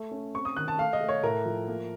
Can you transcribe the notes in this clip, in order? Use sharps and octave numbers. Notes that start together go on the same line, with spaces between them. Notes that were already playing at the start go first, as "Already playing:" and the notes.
Already playing: A3
C#4
C4 C#6
D#6
D#3 F#6
A5
A3 F5
D#5
A3
C#5
A2 A#4
F3
A#3